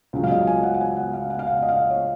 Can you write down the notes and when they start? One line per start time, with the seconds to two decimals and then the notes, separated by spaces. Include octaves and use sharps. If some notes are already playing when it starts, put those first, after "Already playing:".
0.13 C#2 C#3 F#3
0.24 F5
0.31 D#5
0.47 G#5
0.63 F#5
0.74 F#5
0.81 G#5
0.97 F#5
1.13 F5
1.30 F#5
1.39 F5
1.47 F#5
1.62 D#5
1.69 F5
1.90 C#5